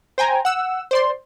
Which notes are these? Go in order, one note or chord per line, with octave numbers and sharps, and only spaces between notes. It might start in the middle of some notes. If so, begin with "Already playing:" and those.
C5 G5 G#5 A#5
F#5 E6
C5 D5 C6